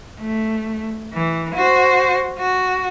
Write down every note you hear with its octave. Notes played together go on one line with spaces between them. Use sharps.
A3
E3
F#4 C5
F#4